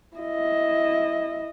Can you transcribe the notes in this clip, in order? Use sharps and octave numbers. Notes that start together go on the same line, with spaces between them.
E4 D#5